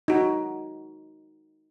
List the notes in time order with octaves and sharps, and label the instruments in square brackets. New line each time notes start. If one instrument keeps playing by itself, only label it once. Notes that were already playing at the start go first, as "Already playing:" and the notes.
[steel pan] D#4 F#4